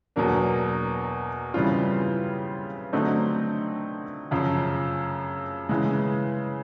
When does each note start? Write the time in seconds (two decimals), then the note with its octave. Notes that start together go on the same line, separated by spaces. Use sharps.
0.16 E2 B2 F#3 A#3 D4
1.54 C#3 E3 G3 C4 F4
2.93 D3 F#3 A3 C4 D#4
4.31 F#2 C#3 F3
5.69 C#3 E3 G#3